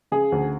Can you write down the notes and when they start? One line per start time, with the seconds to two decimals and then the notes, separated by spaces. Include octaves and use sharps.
0.12 C#3 G#4
0.32 D2